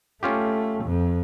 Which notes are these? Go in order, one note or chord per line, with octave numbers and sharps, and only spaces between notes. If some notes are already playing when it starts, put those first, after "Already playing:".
A3 C#4 F4 G4
F2